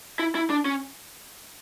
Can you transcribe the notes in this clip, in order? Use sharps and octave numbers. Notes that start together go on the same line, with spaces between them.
E4
E4
D4
C#4